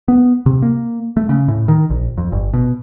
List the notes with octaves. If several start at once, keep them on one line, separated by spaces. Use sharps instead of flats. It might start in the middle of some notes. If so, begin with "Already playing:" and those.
B3
C3
A#3
A3
C#3
A2
D#3
A#1
F2
G1
B2